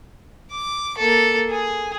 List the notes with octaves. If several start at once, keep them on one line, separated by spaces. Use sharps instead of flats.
D6
A#3 A4
G#4